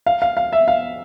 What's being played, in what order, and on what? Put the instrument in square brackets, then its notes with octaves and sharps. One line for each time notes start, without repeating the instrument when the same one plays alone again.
[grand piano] F5
F5
F5
E5
F5